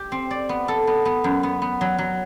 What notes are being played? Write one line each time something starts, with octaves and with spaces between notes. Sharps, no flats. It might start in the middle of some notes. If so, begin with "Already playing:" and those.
Already playing: G4
C4
D5
B3
A4
B3
B3
F#2
B3
B3
F#3
F#3